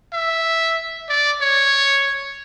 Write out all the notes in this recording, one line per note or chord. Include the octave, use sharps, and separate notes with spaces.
E5
D5
C#5